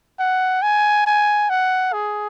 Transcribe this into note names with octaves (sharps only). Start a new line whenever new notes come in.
F#5
G#5
G#5
F#5
G#4